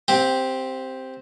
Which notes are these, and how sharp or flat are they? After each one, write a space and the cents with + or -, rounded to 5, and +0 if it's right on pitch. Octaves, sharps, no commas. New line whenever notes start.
C4 +0 G4 +0 F5 +45